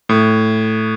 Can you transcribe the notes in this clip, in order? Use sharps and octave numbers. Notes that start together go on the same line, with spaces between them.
A2